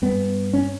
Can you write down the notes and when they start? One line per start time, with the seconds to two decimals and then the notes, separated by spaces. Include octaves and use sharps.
0.02 G2 B3
0.53 C#4